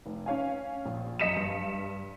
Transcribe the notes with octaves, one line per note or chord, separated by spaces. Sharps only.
F1
C#4 C#5 F5 G#5
A#1
F#2 D#5 B6 C#7 D#7 E7
G2